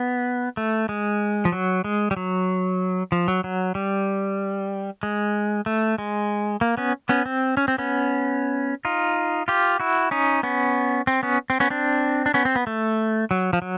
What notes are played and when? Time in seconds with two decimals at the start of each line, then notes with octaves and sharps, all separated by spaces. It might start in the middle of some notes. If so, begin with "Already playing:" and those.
Already playing: B3
0.57 A3
0.89 G#3
1.45 F3
1.52 F#3
1.84 G#3
2.11 G3
2.16 F#3
3.12 F3
3.28 F#3
3.44 F#3
3.75 G3
5.03 G#3
5.66 A3
5.98 G#3
6.61 A#3
6.77 B3 C#4
7.09 B3 C#4
7.26 C4
7.57 C#4
7.68 C4
7.78 B3 C#4
8.85 D#4 F4
9.48 F4 G4
9.80 E4 F#4
10.11 C#4 D#4
10.43 B3 C#4
11.07 C4
11.23 B3 C#4
11.50 C4
11.60 B3 C#4
11.70 C4 D4
12.26 D4
12.34 B3 C#4
12.45 C4
12.56 B3
12.67 A3
13.31 F#3
13.53 F3
13.62 F#3